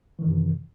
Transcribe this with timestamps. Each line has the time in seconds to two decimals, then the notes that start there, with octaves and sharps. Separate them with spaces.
0.19 E3
0.22 D#3
0.25 F#2
0.29 C3